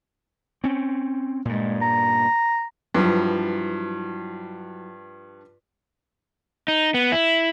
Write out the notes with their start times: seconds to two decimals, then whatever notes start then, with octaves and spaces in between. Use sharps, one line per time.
0.64 C4 C#4
1.45 G2 A#2 G#3
1.81 A#5
2.94 G2 F3 F#3 E4 B4
6.68 D#4
6.94 B3
7.12 E4